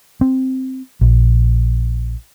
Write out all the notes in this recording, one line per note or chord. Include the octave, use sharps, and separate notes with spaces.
C4
A#1